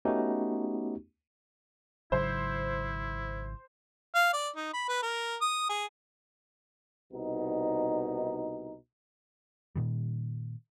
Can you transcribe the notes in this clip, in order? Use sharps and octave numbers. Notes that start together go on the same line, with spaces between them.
A3 B3 C#4 D#4 F#4 G4
G#1 C#3 F#3 E4 C5
F5
D5
D#4
B5
B4
A#4
D#6
G#4
C2 B2 D#4
A#2 D#3 G3